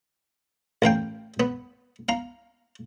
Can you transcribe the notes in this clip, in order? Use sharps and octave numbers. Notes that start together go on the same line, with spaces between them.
A1 A#4 F5 G5
B3
F5 A#5